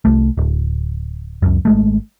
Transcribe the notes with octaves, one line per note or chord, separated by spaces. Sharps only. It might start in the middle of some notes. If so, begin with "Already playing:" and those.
C2 A3
D1
C#2 F#2
G#1 G#3 A3